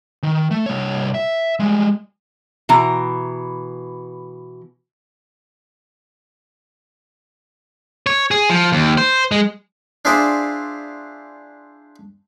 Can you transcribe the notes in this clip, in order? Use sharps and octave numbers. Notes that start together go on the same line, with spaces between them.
D#3
A3
C2 C#5
E5
G3 G#3
B2 E3 A#5
C#5
G#4
F3
D#2
C5
G#3
D4 E4 F4 G#4 C5 D5